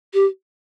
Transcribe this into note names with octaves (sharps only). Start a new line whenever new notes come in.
G4